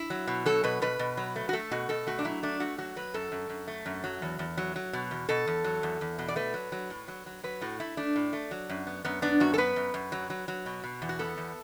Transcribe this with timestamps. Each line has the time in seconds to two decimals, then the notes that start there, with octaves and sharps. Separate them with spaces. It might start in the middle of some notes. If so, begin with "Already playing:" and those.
Already playing: E4
0.10 F#3
0.27 B2
0.46 F#3 A4
0.64 B2 B4
0.82 B2 B4
0.99 B2
1.17 F#3
1.36 A3
1.49 F#4
1.53 A3 A4
1.71 B2 F#4
1.89 B2 A4
2.07 A3 F#4
2.19 D4
2.25 F#3 E4
2.43 A3 D4
2.60 A3 F#4
2.78 F#3 F#4
2.96 F#3 B4
3.14 F#2 A4
3.32 F#2
3.49 F#2
3.68 A3
3.86 F#2
4.04 F#3
4.22 E2
4.39 E2
4.57 F#3
4.76 F#3
4.93 B2
5.11 E2
5.29 B2 A4
5.47 E2
5.64 F#3
5.83 E2
6.01 E2
6.18 B2
6.28 D5
6.36 A3 B4
6.54 F#3
6.72 F#3
6.90 A2
7.08 F#3
7.26 F#3
7.44 F#3 B4
7.61 A2 F#4
7.80 A3 E4
7.97 A3 D4
8.16 A2
8.33 A3
8.51 F#3
8.69 F#2
8.87 B3
9.05 F#2 B3
9.22 B3 D4
9.40 F#2 F#4
9.54 A4
9.58 B3 B4
9.76 F#2
9.94 F#2
10.12 F#3
10.30 F#3
10.48 F#3
10.66 B2
10.84 B2
11.02 E2
11.09 F#4
11.19 B3 A4
11.37 E2